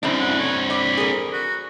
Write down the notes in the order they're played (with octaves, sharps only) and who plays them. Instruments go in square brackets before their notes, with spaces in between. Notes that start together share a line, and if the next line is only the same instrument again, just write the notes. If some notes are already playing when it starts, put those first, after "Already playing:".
[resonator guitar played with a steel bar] F#2 A2 C#3 [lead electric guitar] C4 D4
[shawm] F#5
C#5
[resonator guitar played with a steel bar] D5 [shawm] B5
[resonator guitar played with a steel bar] G#4 A#4
[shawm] F#4